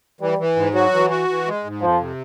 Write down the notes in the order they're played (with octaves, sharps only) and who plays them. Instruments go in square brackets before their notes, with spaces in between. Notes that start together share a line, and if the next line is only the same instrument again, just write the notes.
[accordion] E3 [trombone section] G3
[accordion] E3
G#2
[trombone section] F#3 [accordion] F#4
[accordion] E3
F#4
E3
G#3
G#2
[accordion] F2 [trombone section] F3
[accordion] C3